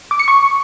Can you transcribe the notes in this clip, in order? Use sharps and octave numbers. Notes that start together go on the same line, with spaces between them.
D6
C#7
C#6